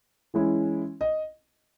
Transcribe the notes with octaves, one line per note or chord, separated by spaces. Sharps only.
E3 G#3 C#4 E4
D#5